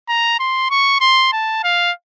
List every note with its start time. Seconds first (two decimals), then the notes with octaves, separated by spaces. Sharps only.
0.09 A#5
0.39 C6
0.71 C#6
1.01 C6
1.32 A5
1.64 F5